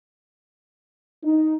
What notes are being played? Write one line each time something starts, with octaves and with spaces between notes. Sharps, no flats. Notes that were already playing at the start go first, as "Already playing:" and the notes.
D#4